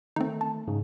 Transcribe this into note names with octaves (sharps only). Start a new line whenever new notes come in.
D#3 A3 C4 D#4
A5
G#2 C#3